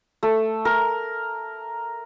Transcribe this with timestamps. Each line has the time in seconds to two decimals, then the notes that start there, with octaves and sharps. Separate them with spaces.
0.23 A3
0.65 A#4